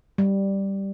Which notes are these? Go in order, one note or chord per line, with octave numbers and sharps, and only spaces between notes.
G3